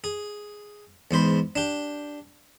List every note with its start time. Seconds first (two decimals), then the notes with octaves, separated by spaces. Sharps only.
0.04 G#4
1.11 E2 G#2 C5 B5
1.56 D4 G4